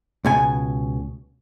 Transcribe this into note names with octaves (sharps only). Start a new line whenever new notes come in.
C#2 B2 G#5